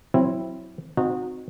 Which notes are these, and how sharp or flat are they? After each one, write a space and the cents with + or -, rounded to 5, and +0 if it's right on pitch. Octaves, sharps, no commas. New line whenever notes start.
F#3 +0 C4 +0 E4 +0
C4 -15 D#4 -10 F#4 -25